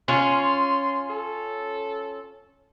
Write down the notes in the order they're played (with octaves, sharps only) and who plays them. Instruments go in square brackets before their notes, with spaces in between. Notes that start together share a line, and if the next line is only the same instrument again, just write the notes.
[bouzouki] C#4 F4 [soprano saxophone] C6
[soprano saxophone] A4